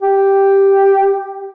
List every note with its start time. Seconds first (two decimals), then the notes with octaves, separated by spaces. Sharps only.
0.02 G4